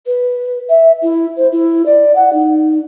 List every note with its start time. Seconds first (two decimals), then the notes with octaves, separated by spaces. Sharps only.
0.06 B4
0.69 E5
1.02 E4
1.36 C5
1.52 E4
1.85 D5
2.15 F#5
2.32 D#4